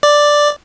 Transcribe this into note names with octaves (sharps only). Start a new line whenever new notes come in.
D5